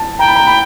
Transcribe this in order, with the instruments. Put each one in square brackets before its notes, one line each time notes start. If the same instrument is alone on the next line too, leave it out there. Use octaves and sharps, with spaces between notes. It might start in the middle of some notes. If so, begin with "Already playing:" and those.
Already playing: [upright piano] A5
[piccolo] G5 [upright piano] A#5
[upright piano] B5
A#5
B5